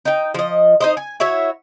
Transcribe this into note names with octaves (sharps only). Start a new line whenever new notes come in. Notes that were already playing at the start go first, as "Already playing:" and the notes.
D#4 G5
F3 D#5
D#4 C5 D#5
G#5
E4 F#4 C#5 E5